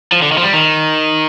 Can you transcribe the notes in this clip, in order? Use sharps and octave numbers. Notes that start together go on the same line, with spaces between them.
F3
D3
D#3
F3
G3
D#3